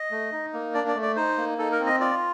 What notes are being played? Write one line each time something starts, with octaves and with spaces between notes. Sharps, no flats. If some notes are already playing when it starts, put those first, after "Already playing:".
Already playing: D#5
A3
D#4
A#3
D4 D5
D5
A3
D5
D#4 C5
A#3
D#4 A4
A#4
C4
D#5
F4 D5